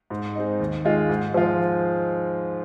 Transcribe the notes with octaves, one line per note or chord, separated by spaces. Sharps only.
G#2
G#3 C4 D#4
D#2
D#3 G#3 F4
G#2
F3 G#3 F4